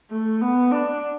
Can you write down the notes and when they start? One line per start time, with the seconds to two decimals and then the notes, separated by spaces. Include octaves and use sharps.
0.11 A3
0.41 B3
0.72 D4